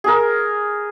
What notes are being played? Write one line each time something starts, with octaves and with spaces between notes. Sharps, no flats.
G#4 A#4